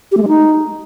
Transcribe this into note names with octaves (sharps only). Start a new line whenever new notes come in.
G4
A3
G#3
D#4